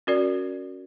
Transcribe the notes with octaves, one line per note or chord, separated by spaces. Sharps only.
C#4 F#4 A#4 D5